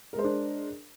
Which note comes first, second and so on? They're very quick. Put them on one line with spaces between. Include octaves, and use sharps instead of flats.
A#4 G#3 C5 G#4 D4